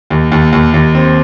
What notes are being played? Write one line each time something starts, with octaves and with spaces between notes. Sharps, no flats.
D#2
D#2
D#2
D#2
C4